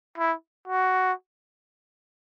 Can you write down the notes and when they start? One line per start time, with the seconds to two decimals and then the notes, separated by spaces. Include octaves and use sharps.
0.18 E4
0.67 F#4